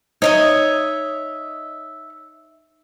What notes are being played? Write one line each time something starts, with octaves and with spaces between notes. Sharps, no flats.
D#4 C#5 D#5 E5